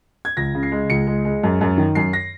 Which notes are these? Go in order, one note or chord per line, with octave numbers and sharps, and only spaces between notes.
G#6
C#2 A#6
C#3
C7
G#3
C#2 C#7
G#3
G#3
F#2
F#2
D#3
F#2 C7
A#6